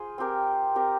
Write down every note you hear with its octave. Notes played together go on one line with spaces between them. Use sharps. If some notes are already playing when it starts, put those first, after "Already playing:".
Already playing: F4 G#4 C5
C4 G4 A#4
C4 G4 A#4